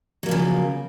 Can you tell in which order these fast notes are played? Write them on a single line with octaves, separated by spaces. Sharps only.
F#3 A#3 F3 C#3